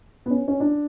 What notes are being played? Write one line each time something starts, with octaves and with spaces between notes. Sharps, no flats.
B3
C#4
C#4
D4